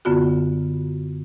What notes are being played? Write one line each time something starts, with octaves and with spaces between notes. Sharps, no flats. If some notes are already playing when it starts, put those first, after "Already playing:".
F#2 D3 B3 F4 F#4